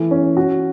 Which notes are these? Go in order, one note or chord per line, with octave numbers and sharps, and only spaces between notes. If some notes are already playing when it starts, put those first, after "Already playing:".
Already playing: E3 A3
C#4
F#4